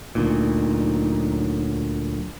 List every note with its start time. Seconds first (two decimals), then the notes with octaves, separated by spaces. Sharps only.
0.15 D2 A#2 F#3 D#4